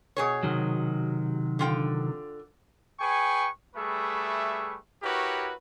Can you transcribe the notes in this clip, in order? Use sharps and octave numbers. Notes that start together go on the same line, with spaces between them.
B2 G#4 C#5
C3 D#3 F#3
D3 F4 G5
G#4 B4 G5 G#5 C#6
G3 A3 G#4 B4 E5 C#6
E4 F#4 G4 A#4 B4 C#5